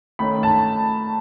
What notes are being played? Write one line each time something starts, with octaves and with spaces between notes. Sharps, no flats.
D#3 A3 C#4 B5
A5